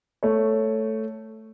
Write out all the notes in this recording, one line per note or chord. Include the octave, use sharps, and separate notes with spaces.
A3 C#5